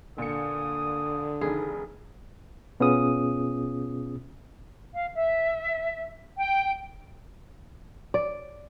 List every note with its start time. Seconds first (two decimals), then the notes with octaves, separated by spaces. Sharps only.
0.18 A#2 D3 D#6 C#7
1.41 F1 D#3 G#4
2.80 B2 B3 C#4 F4 G#4 D#6
4.94 F5
5.15 E5
6.38 G5
8.14 D5